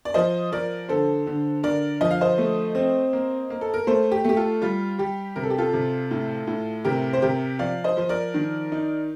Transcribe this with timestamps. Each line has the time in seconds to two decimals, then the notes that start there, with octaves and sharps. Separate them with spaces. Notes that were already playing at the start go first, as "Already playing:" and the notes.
0.05 D5
0.14 F3 C5 D#5
0.52 F3 A#4 D5
0.89 D3 A4 C5
1.27 D3
1.63 D3 A#4 D5
2.01 F3 D#5
2.11 F5
2.21 C5 D#5
2.38 A3
2.75 C4
3.13 A#3
3.50 A#3
3.61 A4
3.74 A#4
3.87 A3 A4 C5
4.12 G4
4.24 A3 G4
4.37 F4 A4
4.62 G3 F4
4.99 G3 G4
5.36 C3 A#4
5.43 A4
5.50 G4
5.58 F4 A4
5.73 C3
6.11 A2
6.47 A2
6.85 C3 G4 A#4
7.13 C5
7.22 C3 G4 A#4
7.59 F3 D5 F5
7.84 C5 D#5
7.97 F3 C5
8.09 A#4 D5
8.34 D#3
8.72 D#4